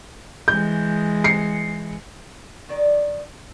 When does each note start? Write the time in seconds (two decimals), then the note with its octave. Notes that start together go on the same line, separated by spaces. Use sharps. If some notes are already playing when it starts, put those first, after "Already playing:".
0.48 E3 G#3 G6
1.24 C7 C#7
2.69 D#3 D5